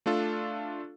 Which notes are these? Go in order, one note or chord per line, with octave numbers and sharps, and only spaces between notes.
A3 D4 F4 A4